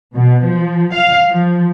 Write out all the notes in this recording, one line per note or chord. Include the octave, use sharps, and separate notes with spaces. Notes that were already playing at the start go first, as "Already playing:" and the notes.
B2
F3
F5
F3